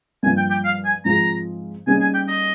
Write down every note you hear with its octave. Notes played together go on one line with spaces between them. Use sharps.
G2 F3 A#3 G#5
G5
G5
F5
G#5
G#2 F3 C4 F4 G#4 A#5
C#3 G3 A#3 D#4 G#4 G#5
G#5
G5
D#5